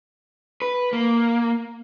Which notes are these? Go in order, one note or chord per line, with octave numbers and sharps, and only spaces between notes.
B4
A#3